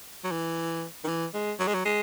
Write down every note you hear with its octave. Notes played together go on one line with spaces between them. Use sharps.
F#3
E3
D#3
E3
G#3
F#3
G#3
F#3
G#3